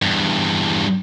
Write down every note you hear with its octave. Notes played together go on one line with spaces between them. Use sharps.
E2 G2